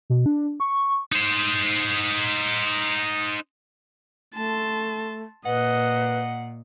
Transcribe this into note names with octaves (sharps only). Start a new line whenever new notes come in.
B2
D4
C#6
D#4 C5
A3 A5 C6
A#2 B4 D#5 F#5